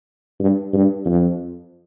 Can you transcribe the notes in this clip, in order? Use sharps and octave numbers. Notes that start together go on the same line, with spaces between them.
G2
G2
F2